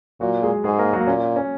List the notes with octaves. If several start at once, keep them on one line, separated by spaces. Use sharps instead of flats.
A#2 F#3 F#4
G#3 G#4
G#2 G#3 G#4
A#3 A#4
F#3 F#4
A#3
A#2 C#4
C#4